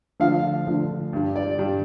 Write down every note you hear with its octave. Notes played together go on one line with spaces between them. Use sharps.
D2 D3 F3 D4 F5
D2 D3 F3 D4
G2 G3 D4
D5
G2 G3 D4